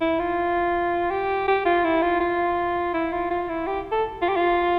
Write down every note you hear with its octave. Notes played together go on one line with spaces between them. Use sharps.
E4
F4
G4
G4
F4
E4
F4
F4
E4
F4
F4
E4
G4
A4
F4
G4
F4